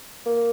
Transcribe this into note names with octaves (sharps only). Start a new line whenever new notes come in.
A#3